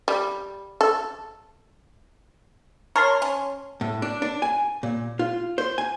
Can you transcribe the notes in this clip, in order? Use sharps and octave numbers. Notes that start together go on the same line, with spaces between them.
G3
A4
A#4 C#5 A5 C6
C#4
A2
D4
D4
G#5
A#2
F4
C5
G#5